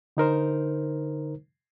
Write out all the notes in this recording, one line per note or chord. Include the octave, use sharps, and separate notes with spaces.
D3 D#4 A#4 C5